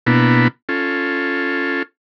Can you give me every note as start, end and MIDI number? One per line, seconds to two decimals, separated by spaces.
0.07 0.48 47
0.07 0.48 58
0.07 0.48 59
0.07 0.48 62
0.07 0.48 64
0.69 1.83 61
0.69 1.83 65
0.69 1.83 69